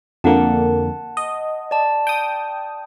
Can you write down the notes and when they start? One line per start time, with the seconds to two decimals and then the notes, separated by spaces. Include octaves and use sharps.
0.24 F2 D3 A#3 F#5 A5
1.17 D#5
1.71 D5 A5
2.07 G5 D#6